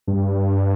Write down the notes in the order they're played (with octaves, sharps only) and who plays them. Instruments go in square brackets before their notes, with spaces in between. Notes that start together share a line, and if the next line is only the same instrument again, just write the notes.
[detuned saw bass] G2